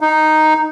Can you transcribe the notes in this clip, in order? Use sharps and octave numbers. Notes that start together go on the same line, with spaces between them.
D#4